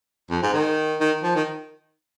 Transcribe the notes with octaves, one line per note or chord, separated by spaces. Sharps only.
F2
G#2
D#3
D#3
F3
D#3